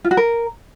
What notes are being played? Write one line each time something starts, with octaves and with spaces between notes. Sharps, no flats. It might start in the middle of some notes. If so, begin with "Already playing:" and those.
F4
F#4
A#4